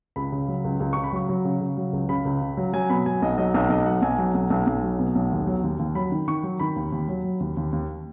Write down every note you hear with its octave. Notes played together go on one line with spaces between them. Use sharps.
C#2 B5
C#3
F#3
C#2
C#2
C#3 C#6
B5
F#3 C#6
F#3
C#3
C#3
F#3
C#2
C#3 B5
C#2
C#3
F#3
F#3 G#5
B2 B5
F#3 G#5
B1 D#5
F#3 D#5
B1 D#5
B1 D#5
F#3 F#5
B1 G#5
F#3
B1
B1
B1
F#3
B2
B1
D#2
F#3
D#2
D#2
F#3 B5
D#3
D#3 C#6
F#3
D#3 B5
D#2
D#2
F#3
F#3
D#2
D#2
D#2